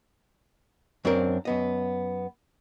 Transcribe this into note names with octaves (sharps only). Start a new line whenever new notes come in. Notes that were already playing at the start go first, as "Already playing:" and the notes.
F#2 C4 D4 A#4
F#2 B3 D#5